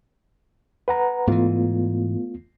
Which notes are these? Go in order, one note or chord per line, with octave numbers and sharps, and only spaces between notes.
B4 F#5 A#5
G#2 E3 A3 B3 F4